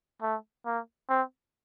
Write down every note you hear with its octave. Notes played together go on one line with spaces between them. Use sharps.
A3
A#3
C4